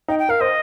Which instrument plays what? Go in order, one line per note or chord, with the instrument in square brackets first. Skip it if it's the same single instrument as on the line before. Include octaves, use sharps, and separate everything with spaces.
[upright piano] D#4 [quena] G5
[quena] G5
[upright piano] A#4 [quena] F5
[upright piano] C5 [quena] D#5